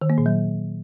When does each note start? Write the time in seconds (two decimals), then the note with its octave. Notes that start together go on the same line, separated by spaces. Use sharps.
0.02 D#3
0.10 A#3
0.18 A#2
0.26 F#3